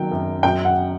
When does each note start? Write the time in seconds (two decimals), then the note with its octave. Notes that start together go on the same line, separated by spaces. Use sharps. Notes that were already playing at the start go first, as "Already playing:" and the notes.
Already playing: D#3 F#3 G5
0.11 F#2
0.43 F#2 G5
0.65 F#5